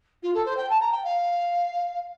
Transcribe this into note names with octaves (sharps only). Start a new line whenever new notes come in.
F4
A4
C5
G5
A5
A#5
G5
F5